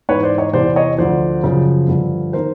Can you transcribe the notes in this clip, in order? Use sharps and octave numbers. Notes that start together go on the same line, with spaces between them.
G#2 E3 B4 C#5
C5 D5
C#5 D#5
E2 C3 E3 C5 D5
C#5 D#5
D2 D3 F3 C5 D5
F#2 C#3 F3
G2 D3 F3
D#3 A#4 C5